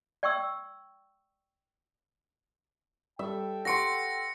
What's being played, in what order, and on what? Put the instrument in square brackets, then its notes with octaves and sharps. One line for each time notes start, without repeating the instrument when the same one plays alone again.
[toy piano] D5 G5 C#6 E6
[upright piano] G3 [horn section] A4 G5 [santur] E5
[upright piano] G4 C#6 D7 [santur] F#5 C6 [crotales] A#6 C#7